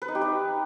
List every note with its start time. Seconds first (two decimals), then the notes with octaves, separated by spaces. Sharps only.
0.02 B4
0.08 D#4
0.15 G4
0.21 D#4